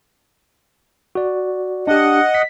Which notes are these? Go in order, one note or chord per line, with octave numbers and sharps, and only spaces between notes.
F#4 D5
D4 G4 D#5 F#5
B6